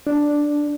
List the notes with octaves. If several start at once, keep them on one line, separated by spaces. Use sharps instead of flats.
D4